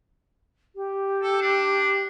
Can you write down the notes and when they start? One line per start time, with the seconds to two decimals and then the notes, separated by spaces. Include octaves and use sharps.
0.76 G4
1.23 A4
1.41 D4